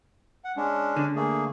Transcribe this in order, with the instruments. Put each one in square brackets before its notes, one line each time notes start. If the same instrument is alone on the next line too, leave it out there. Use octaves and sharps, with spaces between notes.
[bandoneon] F#5
G#3 C#4 D4
[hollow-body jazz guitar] D3
[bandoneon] A3 A#3 G#4